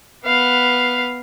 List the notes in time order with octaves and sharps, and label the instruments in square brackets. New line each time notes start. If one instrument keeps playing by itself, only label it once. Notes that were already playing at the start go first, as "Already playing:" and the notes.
[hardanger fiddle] B3 F5